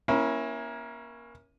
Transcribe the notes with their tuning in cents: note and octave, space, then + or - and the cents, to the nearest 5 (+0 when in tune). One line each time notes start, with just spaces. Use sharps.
A#3 +25 C#4 -10 E4 +0